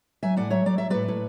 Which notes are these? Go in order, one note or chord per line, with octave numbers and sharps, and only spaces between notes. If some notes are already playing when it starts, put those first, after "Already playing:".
F#3 E5 G#5
A2 D5 F#5
F#3 C#5 E5
F#3 D5
F#3 E5
A2 B4 D5
A2